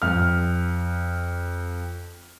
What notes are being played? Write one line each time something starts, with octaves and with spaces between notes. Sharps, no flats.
F2 F6